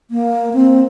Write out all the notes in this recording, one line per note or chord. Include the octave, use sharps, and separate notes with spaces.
A#3
C4